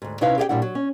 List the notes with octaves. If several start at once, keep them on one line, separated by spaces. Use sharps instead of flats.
D2 G#2
C3 C#4 D#4 E4 B4 F5
G4 G#4 F5 G5
A#2 G3 D4 E4 F#5
F#3
C#4